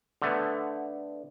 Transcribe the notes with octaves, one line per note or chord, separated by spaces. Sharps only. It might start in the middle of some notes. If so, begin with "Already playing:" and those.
D3 A3 B3